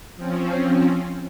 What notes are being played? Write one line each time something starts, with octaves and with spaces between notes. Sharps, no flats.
F3 C4 C#4